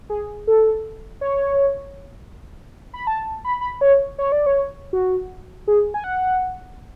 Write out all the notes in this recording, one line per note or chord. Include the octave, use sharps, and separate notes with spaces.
G#4
A4
C#5
B5
A5
B5
B5
C#5
C#5
D5
C#5
F#4
G#4
G#5
F#5